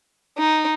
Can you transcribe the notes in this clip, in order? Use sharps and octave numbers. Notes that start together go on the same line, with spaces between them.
D#4